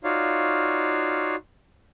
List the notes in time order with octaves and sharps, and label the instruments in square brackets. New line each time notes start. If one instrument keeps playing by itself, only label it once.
[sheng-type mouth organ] D#4 F4 F#4 C#5 D5 F5